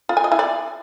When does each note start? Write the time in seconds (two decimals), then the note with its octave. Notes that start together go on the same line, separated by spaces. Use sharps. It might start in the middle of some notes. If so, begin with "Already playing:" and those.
0.09 F4
0.17 G#5
0.24 D#5
0.32 E4
0.39 D5